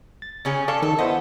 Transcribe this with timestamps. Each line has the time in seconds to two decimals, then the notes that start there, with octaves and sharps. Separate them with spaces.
0.22 A6
0.45 C#3 C#4 G#4
0.68 A4 D5 F5 C#6
0.82 D#3 A4
0.99 B3 E4 C5 D#5